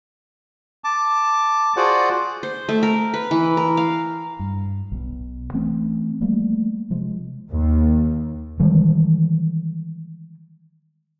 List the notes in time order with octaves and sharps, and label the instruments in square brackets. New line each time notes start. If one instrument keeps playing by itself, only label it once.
[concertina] A5 D6
F4 F#4 G#4 C5 D5 F#5
[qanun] C5
A3
A#4
B4
E3
A#4
F5
[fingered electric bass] G2
B1 B2
E3 A3 C4 C#4
F3 G3 A3 A#3
C3 F3 G#3
[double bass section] D#2
[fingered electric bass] D#3 E3 G3 G#3